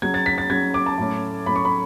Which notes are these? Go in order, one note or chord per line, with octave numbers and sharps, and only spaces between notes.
C#3 F#3 C#4 G#6
A6
B6
A6
C#3 F#3 C#4 G#6
D6
A5
A2 F#3 A3 C#4
A2 F#3 A3 C#4 B5
C#6
B5